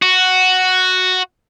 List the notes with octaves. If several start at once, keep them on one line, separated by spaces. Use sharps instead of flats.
F#4